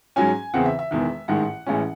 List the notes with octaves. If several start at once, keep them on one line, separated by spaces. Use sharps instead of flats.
G#2 F#3 C#4 G#5
E2 C#3 E3 C4 F#5
E5
E5
E1 E2 D#3
A1 G#2 D#3 F#5
A1 A2 E3 G#3 C#4